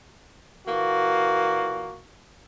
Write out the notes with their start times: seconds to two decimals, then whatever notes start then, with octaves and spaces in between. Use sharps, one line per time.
0.68 A#2 E3 A#3 F#4